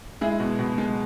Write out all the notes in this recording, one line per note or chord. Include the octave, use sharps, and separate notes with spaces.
G#3 E4 G#4
B2
B2
G#3